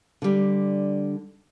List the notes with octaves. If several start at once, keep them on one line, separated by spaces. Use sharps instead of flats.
D3 G3